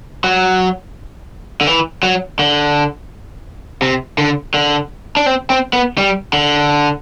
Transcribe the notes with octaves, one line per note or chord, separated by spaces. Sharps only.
F#3
D3
E3
F#3
D3
C3
D3
D3
D4
C4
C4
B3
G3
D3